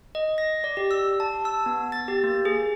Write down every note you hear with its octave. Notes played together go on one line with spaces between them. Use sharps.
D#5
A#6
D5
G4
E6
A5
E6
B3
A6
G4
A#3
G#4